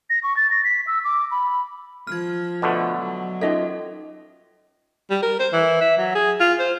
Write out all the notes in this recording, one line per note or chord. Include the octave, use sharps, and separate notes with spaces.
A#6
C#6
A6
A#6
B6
E6
D6
B5
F3 F6 G#6
B2 D3 A3
F#3
C#4 D#4 F4 A4 D#5 E5
G3
A#4
C5
E3
E5
F#3
G#4
F4
C5